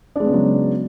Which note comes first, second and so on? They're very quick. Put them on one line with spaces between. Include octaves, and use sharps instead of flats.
D4 G#3 B3 C#3 F#3